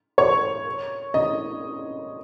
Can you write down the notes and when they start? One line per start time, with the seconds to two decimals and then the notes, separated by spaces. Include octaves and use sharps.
0.18 C#5 C#6
1.14 D#5